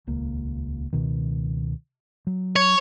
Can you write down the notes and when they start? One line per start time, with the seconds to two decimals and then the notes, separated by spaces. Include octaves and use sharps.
0.07 D#1 C#2 A#3
0.93 C#2 B2 D#3
2.27 F#3
2.56 C#5